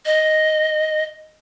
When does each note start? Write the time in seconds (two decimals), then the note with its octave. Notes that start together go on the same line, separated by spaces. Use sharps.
0.06 D#5